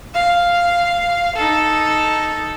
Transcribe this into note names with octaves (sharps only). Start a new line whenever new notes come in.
F5
D#4 A4